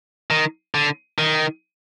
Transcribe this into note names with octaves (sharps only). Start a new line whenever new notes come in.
D#3
D3
D#3